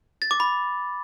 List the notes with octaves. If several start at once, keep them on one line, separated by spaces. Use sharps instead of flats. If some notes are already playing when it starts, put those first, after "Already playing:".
A6
D6
B5